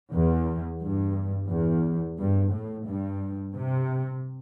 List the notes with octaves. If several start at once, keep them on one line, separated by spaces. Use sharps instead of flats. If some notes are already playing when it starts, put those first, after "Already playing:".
E2
G2
E2
G2
A2
G2
C3